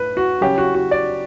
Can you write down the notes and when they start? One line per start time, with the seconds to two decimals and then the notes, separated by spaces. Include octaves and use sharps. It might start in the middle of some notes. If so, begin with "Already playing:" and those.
Already playing: A2 B4
0.17 F#4
0.41 C#3 F#3 C#4 G4
0.58 F#4
0.74 F#4
0.91 D5